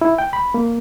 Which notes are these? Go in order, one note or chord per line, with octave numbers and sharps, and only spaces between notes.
E4
G5
B5
A#3